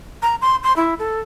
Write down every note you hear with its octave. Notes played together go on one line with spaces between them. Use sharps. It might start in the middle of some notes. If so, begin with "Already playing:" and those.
A#5
C6
C6
E4
A4